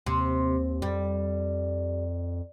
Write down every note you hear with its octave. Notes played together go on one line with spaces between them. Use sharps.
D#2 C3
F2 G3